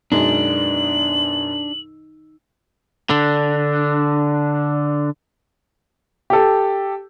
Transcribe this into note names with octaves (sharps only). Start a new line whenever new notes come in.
F#2 B2 G#3 D4 D#4 F#7
D3 D4
G4 A4